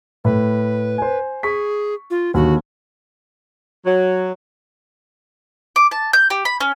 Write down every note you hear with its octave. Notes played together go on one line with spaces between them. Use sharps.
A2 B4
C5 G#5
G#4 C#6 B6
F4
D#2 D3 F#4
F#3
D6
A5
G6
G4
B5
C#4